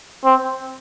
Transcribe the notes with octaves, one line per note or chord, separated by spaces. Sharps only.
C4